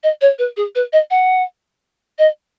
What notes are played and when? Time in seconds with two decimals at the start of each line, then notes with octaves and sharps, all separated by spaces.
0.03 D#5
0.21 C#5
0.39 B4
0.57 G#4
0.75 B4
0.93 D#5
1.11 F#5
2.19 D#5